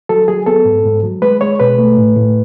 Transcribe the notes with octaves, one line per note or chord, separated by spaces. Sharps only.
F#3 A4
F#3 G#4
B3 A4
G#2
G#2
F#3
G#3 B4
G#3 C#5
B2 B4
A3
A2
A2